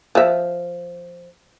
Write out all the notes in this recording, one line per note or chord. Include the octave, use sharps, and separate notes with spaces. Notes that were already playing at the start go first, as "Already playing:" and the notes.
F3 E5